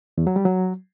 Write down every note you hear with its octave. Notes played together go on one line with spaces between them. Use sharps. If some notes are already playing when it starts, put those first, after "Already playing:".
E2
F#3
G3
F#3